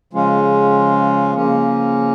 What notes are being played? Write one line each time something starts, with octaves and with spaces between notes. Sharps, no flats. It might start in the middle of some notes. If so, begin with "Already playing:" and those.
C#3 F3 G#3 C#4 F4
C#3 F3 A#3 C#4